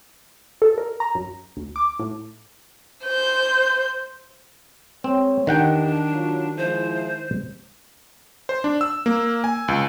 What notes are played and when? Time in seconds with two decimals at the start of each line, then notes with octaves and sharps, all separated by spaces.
0.62 A4
0.78 A#4
1.00 A#5
1.15 F#2
1.57 D2
1.76 D6
1.99 A2
3.05 C5 G6
5.04 G#3 C4 C5 C#5
5.47 E2 D#3 D4 G4 D#5 F#5 G5
6.11 F#3 F4
6.57 F3 G#3 E4 C5
8.49 C5
8.64 D4
8.81 E6
9.06 A#3
9.44 G#5
9.68 C#2